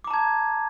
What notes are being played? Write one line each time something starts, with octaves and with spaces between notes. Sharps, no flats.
A5 A#5 D6 G#6